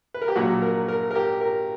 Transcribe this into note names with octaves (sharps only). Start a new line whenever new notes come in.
B4
A#4
G4
A#1 A#2 F#3 F#4
A#4
A#4
A#4
G4
A#4